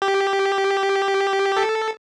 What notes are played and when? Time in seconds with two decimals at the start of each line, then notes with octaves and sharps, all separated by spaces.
0.02 G4
1.57 A4